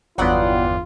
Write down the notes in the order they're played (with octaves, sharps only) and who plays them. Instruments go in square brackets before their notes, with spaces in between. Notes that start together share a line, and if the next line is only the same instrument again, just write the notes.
[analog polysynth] G1 E2 [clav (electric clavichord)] F#3 B3 [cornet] F4 [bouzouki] D5 F#5 G5